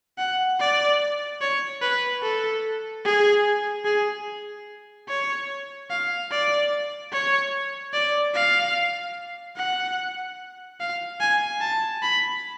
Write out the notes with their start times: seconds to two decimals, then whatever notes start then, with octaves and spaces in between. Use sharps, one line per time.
0.18 F#5
0.60 D5
1.41 C#5
1.82 B4
2.23 A4
3.05 G#4
3.85 G#4
5.08 C#5
5.90 F5
6.31 D5
7.12 C#5
7.93 D5
8.35 F5
9.57 F#5
10.80 F5
11.20 G#5
11.61 A5
12.02 B5